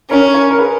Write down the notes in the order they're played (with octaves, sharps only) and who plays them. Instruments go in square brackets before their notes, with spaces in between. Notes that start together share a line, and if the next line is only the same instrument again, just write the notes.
[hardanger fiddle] C#4 [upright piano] A#4 C#5
[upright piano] A#4 C#5
A#4
G#4 B4